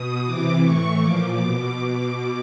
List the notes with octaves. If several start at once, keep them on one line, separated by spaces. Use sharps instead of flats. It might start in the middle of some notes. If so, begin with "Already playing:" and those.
Already playing: B2 D#6
C3 E3 D6
A2 E3 C#6
A#2 F3 D6
B2